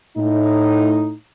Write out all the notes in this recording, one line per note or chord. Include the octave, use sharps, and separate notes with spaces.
A2 D#4